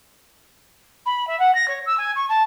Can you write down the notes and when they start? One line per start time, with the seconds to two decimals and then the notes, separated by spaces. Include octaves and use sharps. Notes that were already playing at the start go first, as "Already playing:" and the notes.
1.05 B5
1.27 E5
1.39 F#5
1.54 A#6
1.68 C#5
1.86 E6
1.97 G#5
2.16 C#6
2.28 A5